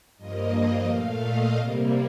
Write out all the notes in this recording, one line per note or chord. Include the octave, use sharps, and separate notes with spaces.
G2 F3 A#3 D#5
A#2 A3 F5
D#5
C3 G3 A#3